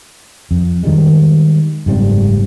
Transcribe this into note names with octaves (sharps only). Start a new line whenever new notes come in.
F2
D#3 E3 G3 G#3
F#1 G#2 G3 C4